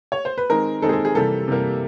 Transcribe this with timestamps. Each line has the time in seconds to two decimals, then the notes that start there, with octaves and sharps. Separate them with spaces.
0.12 C#5
0.25 C5
0.38 B4
0.50 D#3 G#3 C4 A#4
0.82 D#3 G#3 C4 A4
0.89 G#4
0.93 A4
1.05 G#4
1.15 C3 E3 G3 A#3 A4
1.48 C3 E3 G3 A#3